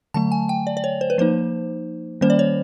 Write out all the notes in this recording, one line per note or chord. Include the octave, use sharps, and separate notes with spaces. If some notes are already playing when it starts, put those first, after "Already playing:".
D3 F#3 A3 A5
G#5
G5
D5
D5
C#5
C5
B4
F3 A#3 D#4 C5
D#3 G3 A#3 C#4 C5
D5
C#5